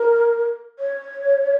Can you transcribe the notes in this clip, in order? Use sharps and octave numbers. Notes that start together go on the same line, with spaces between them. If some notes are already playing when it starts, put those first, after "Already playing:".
Already playing: A#4
C#5